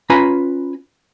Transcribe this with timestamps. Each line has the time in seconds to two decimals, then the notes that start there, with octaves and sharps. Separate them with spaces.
0.10 C#4 F4 B4 G#5 A#5 B5